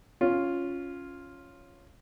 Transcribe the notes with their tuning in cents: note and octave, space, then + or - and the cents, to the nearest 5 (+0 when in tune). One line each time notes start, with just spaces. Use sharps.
C#4 +0 F4 +0